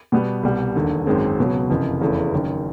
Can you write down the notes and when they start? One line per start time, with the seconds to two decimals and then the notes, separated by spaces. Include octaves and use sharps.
0.12 B2 G3 B3
0.43 C2 B2 G3
0.76 E1 D#2 D3
1.06 G#1 F#2 D#3 G#3 C4
1.38 C#2 B2 F#3
1.69 F#1 F2 C3 E3
2.01 F1 E2 C#3 E3 A3
2.33 F#1 F#2 D#3